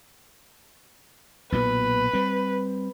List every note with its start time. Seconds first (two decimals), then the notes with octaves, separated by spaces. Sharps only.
1.52 B1 A#2 B3 B4
2.13 G3 C4